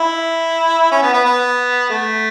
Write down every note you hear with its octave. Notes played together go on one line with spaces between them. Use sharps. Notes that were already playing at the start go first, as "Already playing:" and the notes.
Already playing: E4
C#4
B3
B3
B3
A3